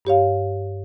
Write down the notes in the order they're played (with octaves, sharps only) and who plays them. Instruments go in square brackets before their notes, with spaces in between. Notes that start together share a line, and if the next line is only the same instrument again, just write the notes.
[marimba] G2 G4 C#5 F5